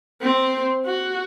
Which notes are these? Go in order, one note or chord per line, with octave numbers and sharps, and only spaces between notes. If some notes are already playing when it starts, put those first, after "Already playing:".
C4 C5
F#4